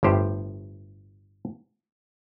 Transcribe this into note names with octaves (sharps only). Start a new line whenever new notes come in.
G1 A2 G4 C5